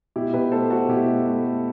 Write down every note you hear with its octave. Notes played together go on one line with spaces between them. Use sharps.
B2 E4 G4
B2 G4 B4
A3 A4 C5
A3 F#4 A4
B2 E4 G4
A3
A3
A3